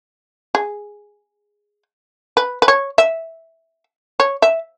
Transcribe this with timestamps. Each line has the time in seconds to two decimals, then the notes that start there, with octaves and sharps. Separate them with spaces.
0.55 G#4
2.37 B4
2.62 B4
2.68 C#5
2.98 E5
4.20 C#5
4.42 E5